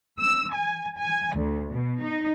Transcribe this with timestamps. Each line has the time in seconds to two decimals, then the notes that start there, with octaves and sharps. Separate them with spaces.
0.20 E6
0.53 G#5
0.98 G#5
1.36 D2
1.72 B2
2.02 D#4